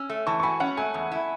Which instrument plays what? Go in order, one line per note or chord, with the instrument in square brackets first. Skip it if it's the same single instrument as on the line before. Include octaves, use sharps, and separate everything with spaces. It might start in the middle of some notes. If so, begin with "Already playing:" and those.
Already playing: [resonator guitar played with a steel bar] C#4 [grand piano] E6
[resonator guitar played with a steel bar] A3
[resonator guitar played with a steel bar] E3 [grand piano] A5 C#6
[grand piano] C#6
[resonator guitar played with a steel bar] F#4 [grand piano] G#5 B5
[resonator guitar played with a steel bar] C#4 [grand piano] F#5
[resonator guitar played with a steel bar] A3 [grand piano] G#5
[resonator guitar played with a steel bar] E2
E4